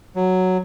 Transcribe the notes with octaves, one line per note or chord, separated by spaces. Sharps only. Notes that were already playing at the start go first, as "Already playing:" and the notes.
F#3